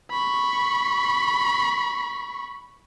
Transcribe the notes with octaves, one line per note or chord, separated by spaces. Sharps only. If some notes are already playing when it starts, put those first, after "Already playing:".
B5 C#6